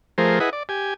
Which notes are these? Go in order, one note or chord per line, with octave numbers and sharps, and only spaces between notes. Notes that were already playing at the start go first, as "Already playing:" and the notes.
F3 A3 G#4 A#4 C5
E4 G#4 B4 D#5 F#5
D5
G4 G#5